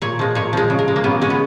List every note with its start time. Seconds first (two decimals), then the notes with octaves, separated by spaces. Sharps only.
0.02 A#2 C#5
0.19 F3 G#3
0.35 A#2 C#5
0.53 F3 G#3
0.70 C#3
0.79 A#4
0.88 G#3
0.96 A#3
1.04 C#3 B3
1.21 G#3 C#4
1.30 B3